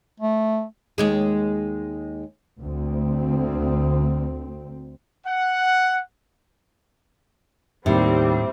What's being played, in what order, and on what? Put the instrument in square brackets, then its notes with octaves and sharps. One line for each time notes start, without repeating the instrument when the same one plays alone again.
[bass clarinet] A3
[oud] D#2 G#3 G#4
[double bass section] D2 C4
[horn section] F#5
[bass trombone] D#2 [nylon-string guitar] A2 [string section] G3 C4